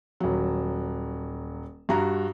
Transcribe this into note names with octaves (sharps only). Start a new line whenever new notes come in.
D#1 F#3
G2 F#4 A#5